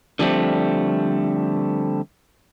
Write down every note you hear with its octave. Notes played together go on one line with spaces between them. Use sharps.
D3 F3 G3 A3 C4